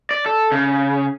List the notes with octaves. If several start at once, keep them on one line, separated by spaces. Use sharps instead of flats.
D5
A4
C#3